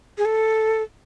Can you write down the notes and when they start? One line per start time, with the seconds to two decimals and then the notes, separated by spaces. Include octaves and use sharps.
0.18 G#4
0.25 A4